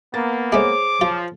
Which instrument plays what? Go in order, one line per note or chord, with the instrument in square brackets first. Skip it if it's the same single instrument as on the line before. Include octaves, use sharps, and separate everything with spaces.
[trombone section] A#3 B3 [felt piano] A6
[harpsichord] G#3 A3 [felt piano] G#4 C5 C#5 [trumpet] D6
[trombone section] F3 [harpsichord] F4